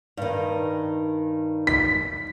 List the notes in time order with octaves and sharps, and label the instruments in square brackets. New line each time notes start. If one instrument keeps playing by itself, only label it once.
[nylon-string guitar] G2 D#3
[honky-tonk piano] B6